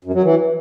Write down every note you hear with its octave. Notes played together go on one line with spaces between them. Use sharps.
F#2
F#3
E3